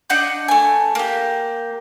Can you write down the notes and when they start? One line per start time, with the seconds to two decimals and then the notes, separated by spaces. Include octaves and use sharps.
0.10 D4 D#5 F#5 G6
0.48 A3 G#5
0.95 A#3 G4